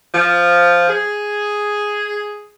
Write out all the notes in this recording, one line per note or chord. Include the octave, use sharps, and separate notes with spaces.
F3
G#4